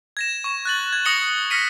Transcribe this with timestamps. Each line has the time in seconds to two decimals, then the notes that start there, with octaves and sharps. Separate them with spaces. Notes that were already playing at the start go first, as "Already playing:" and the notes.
0.17 G#6 A#6 E7
0.44 C#6 E7
0.65 F#6 A6 F#7
0.93 G#6
1.05 D#6 A#6 C#7 F#7 G7
1.50 F6 A#6 B6 C#7 D#7